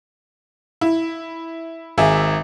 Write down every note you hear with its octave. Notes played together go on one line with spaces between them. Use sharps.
E4
G#1 G#4 E5